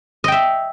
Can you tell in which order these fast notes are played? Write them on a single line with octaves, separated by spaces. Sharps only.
D#5 G5 E5